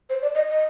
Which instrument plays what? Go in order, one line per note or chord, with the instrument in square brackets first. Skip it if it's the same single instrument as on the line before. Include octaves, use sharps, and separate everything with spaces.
[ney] C5
D5
D#5
D#5